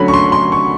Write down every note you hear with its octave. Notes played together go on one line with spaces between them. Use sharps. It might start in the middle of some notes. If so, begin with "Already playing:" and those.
Already playing: D3 F#3 A3 C#4 B5
C#6
C6
C6
C#6